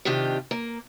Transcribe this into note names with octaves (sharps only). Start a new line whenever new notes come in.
C3 D#3 D4 F4 G4
A#3